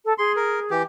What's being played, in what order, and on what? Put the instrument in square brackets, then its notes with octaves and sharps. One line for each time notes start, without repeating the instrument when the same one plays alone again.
[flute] A4
[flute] G#4 [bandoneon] C6
[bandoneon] A#4
E3 G4